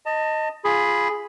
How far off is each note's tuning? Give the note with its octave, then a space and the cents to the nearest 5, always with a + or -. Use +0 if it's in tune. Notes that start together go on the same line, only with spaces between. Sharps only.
D#5 +0 A5 +30
F4 +5 G#4 +0 B5 +0